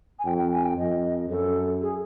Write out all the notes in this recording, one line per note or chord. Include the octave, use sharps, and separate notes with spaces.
G#5
F2 G5
G5
G#5
G5
F2 D#5
F#2 A4
G#4